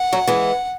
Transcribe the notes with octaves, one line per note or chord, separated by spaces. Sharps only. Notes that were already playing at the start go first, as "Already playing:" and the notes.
Already playing: F#5
F#3 A3
E3 G#3